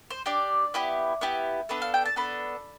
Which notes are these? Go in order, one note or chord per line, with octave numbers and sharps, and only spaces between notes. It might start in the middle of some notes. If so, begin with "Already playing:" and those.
C5
D4 G4 D5
B3 E4 G4
B3 E4 G4
B3 D4 A4 B4
F5
G5
A5
B3 D4 A4 B5